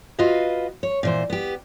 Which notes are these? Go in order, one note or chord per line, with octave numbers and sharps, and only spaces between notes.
F4 F#4 B4 D#5 F5
C#5
A#2 E3 C5
B3 G4